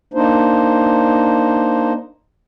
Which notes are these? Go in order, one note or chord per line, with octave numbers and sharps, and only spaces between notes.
A#3 D4 D#4 C5